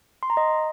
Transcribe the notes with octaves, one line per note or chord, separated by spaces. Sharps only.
C6
A#5
D#5